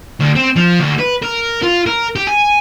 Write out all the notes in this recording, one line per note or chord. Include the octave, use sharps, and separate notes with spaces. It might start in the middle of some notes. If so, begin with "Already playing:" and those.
D2
C4
F3
D2
B4
A#4
F4
A#4
G4
G#5